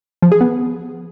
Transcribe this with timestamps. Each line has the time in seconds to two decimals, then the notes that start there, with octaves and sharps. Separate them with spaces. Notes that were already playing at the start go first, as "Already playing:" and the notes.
0.22 F3
0.32 G#4
0.41 B3